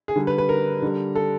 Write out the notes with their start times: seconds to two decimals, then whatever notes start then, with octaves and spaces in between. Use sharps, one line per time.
0.08 G#4
0.16 D3 G3
0.27 B4
0.38 B4
0.49 A#4
0.82 D3 G3
1.15 A4